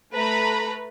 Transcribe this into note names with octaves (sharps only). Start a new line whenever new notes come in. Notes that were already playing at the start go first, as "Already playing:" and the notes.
A3 B4 A#5 B5